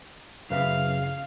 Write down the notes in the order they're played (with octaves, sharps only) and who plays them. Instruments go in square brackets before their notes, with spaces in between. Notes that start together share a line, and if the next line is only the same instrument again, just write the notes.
[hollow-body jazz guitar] F#2 B4 E5 [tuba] C#3 [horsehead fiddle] F5